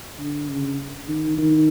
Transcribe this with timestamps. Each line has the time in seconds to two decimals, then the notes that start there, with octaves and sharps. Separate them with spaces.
0.19 D3
0.49 C#3
1.08 D#3
1.38 D#3